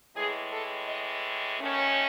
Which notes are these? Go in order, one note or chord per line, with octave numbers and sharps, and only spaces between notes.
A2 E3 G#3 G#4
A4
D#5
D#2 D#3 A3 C#4